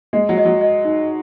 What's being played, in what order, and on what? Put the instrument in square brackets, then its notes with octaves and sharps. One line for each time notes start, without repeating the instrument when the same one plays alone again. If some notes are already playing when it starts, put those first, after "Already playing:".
[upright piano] G#3 [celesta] D#5
[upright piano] F#3
[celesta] D#5
[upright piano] F#3
[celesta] D#5
D#4